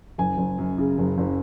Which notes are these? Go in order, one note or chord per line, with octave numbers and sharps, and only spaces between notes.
F#1 G#5
F#1
F#2
C#3
F#1
F#1